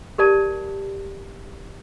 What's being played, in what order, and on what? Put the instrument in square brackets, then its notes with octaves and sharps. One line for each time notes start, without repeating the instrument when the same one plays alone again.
[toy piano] G4 A#4 D5 A5